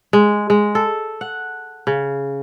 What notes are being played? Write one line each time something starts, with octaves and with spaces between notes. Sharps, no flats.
G#3
G#3
A4
F#5
C#3